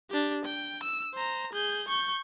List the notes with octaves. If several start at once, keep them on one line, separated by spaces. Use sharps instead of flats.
D4 G4
G5
E6
C5 A#5
G#4 G6
C#6 G6